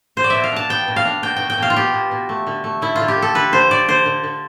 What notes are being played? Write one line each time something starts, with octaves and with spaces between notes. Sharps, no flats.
B2 C5
D5
B2 E5
F5
D4 A5
B3 G5
B2
F5
D4
B2 G5
B2 G5
G5
B2 F5
F4
B3 G4
B2
B2
A3
D3
A3
D3 E4
D3 F4
G4
D3
A4
D3 B4
D3 C5
D3 D5
D3 C5
D3
D3